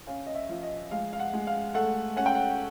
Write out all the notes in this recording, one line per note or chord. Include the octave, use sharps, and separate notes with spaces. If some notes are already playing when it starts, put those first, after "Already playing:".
C#4 F5
D#5
E5
F3
D#5
G#3 F5
F5
F#5
G#3
F5
A3 F#5
C#4 F#5
G5
F#5